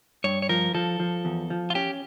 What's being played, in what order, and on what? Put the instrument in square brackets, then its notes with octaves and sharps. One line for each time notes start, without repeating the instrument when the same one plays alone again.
[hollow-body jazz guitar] G2 [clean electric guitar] C#5
[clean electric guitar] C#5
[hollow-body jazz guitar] F3 [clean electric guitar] A#4
[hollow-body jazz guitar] F3 [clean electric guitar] A4
[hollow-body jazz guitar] F3
E2
F3
[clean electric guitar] F4
[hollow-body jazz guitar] C#4 [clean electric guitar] G4